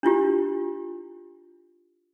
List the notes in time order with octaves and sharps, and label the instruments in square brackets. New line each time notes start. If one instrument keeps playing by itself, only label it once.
[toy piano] D4 E4 F4 G4